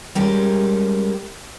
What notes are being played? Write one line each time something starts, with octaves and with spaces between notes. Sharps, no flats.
G3 G#3 C#4 G4 A#4